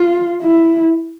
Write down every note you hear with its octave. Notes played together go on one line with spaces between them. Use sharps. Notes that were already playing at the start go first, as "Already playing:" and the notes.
Already playing: F4
E4